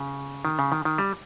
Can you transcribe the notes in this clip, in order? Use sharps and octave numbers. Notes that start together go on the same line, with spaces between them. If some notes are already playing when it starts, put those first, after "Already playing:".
Already playing: C#3
D#3
C#3
D#3
D#3
G3